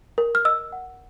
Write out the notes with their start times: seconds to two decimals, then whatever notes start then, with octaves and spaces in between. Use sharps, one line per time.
0.18 A#4
0.35 F6
0.45 D#5 E6
0.72 F#5